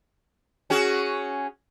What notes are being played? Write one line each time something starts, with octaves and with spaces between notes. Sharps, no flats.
C#4 F#4 G#4